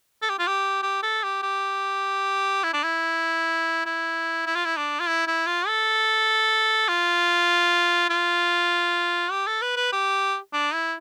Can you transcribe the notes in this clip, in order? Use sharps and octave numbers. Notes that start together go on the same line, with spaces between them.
A4
G4
F4
G4
G4
A4
G4
G4
E4
D4
E4
E4
E4
F4
E4
D4
F4
E4
E4
F4
A4
F4
F4
G4
A4
B4
B4
G4
D4
E4